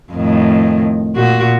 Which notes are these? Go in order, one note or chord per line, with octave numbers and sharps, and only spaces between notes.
F2 A2 D#3
A#2 F#4